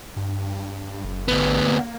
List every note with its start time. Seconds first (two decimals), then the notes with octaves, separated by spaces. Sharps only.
0.17 G2
1.04 F#1
1.28 A1 D2 B3
1.67 A#3